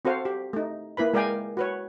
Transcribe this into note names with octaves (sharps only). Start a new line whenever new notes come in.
C4 F#4 A4 C5 F5
G4
A3 D#4
A#3 E4 B4 B5
G#3 A#4 D5 F5 G5 G#5
F#4 B4 C#5